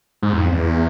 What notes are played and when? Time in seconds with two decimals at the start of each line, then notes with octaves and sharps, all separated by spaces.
0.22 G#2
0.33 E2
0.37 F2
0.52 E2